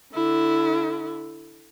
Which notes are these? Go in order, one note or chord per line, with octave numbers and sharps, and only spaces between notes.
D3 E4